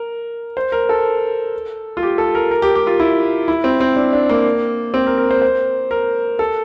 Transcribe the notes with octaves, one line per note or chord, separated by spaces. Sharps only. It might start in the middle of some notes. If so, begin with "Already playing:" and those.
Already playing: A#4
C5
A#4
A4
F4
G4
A4
A#4
A#4
G4
G4
F4
E4
E4
C4
C4
D4
D4
A#3
C4
A#4
A#4
C5
C5
A#4
A4